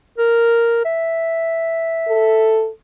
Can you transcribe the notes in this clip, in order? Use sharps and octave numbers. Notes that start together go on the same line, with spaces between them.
A#4
E5
A4